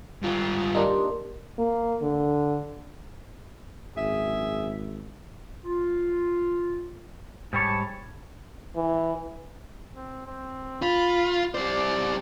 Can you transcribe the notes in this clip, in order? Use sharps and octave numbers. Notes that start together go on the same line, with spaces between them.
G2 F4
A#3 D4 D#4 G4 A#4 C6
A#3
D3
G#1 F#2 G#4 E5
F4
G#2 G3 C#5 A5
E3
C4
C4
F4 B5
G3 C5 D5